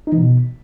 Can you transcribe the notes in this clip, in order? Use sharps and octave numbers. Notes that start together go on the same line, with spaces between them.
D#4
E3
B2